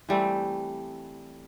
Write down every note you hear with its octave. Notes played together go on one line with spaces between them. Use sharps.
E3 G3 A3 C4